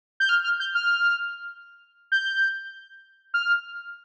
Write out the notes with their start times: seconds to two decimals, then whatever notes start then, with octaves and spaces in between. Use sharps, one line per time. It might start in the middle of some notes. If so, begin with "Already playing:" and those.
0.20 G6
0.29 F6
0.44 F6
0.60 G6
0.75 F6
2.12 G6
3.34 F6